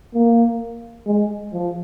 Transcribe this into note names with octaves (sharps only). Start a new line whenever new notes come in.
A#3
G#3
F3